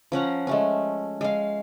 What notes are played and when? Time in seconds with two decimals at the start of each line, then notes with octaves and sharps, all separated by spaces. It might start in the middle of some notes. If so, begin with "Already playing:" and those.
0.12 F3 C#4 F#5 A#5
0.47 G#3 A3 C#4
1.21 G#3 F5